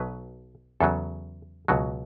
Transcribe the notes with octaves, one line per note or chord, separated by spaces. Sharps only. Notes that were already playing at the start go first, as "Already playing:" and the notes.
Already playing: B1 B2 F#3 B4
E2 C#3 F#3 A4
C#2 B2 F#3 F#4